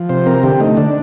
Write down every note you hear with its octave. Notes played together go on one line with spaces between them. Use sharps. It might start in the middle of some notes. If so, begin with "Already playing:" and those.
Already playing: F3
C3 C5
C4 A#4
D3 G4
A3 D#4
D3 D4